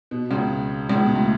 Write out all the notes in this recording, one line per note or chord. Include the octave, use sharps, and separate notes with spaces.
B2
C#2 C#3
C#2 C#3
B2
A2